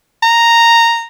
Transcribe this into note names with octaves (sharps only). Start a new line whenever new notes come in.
A#5